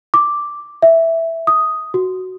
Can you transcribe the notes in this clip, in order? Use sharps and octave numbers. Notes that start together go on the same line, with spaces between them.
D6
E5
D#6
F#4